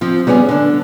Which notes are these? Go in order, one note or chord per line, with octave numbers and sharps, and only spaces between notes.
F3 C4
G3 B3 C#4 G4 G#4
D3 D4